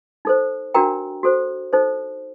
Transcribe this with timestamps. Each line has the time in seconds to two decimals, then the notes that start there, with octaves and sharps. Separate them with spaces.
0.25 D#4 A4 C5
0.74 D4 F#4 A#4 G5 A#5
1.23 F#4 A4 C5
1.73 D#4 A4 C5